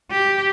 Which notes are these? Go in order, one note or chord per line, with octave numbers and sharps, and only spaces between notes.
G4